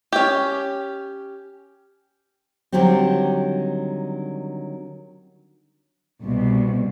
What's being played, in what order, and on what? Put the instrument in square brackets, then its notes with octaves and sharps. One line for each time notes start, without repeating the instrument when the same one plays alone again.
[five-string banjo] C#4 G4
[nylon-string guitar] D3 D#3 F#3 G3 A3 C4
[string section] C2 B2